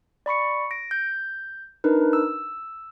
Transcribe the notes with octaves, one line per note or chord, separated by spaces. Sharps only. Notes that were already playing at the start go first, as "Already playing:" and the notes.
D5 B5 C#6 C#7
A#6 D7
G6
D4 D#4 A#4 B4
E6